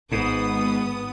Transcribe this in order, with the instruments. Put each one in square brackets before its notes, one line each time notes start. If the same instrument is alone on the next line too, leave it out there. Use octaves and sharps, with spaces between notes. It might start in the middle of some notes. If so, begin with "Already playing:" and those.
[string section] G#1 B3 D#6 [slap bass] G#2